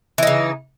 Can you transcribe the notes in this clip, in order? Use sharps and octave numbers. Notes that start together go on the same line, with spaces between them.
C#3 E3 D#4